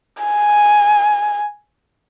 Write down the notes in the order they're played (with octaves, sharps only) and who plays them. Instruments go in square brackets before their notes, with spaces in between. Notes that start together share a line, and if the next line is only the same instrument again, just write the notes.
[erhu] G#5